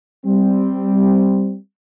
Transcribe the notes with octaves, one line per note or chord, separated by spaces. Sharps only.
G3 C4